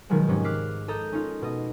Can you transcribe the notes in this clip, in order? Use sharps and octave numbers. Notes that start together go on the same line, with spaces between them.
B2 D#3 F3 F#3 G#3
G#2 C3 C#4
D6 F6 F#6 B6 C7
A4 D#5 A#5 G6
C#4 D#4 F4
B2 D#5